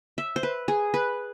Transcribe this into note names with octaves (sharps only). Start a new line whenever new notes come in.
E5
C5
B4
G#4
B4